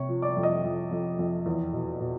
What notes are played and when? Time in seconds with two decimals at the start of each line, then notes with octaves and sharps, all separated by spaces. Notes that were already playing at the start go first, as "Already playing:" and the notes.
Already playing: C3 C#5 C#6
0.09 F3
0.22 D5 D6
0.37 F2
0.43 D#5 D#6
0.64 F2
0.91 F2
1.19 F2
1.46 E2
1.73 B2
2.00 B2